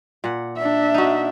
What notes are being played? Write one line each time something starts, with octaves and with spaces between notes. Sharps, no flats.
A#2 F#5
D4 E5
D#4 F#4